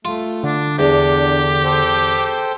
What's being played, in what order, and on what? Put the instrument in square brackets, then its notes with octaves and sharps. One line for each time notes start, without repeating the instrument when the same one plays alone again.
[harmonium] A3 [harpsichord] F4
[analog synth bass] D3 [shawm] D4
[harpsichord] E2 [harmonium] D4 [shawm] G4
[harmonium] A4 C5 G5